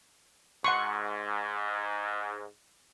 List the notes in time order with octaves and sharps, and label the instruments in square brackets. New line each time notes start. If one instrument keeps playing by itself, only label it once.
[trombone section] G#2 [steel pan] F#5 C6 C#6